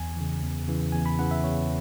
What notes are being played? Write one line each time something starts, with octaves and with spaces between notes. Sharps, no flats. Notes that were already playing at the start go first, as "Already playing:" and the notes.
Already playing: E2 G#5
C#3 E3
E2
C#3 E3
E2 G#5
B5
C#3 E3 F#5
E5
E2 C#5